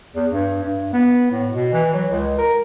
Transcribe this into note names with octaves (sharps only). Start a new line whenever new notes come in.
E2
G2
G2
B3
A2
B2
E3
F#3
C#2
A#4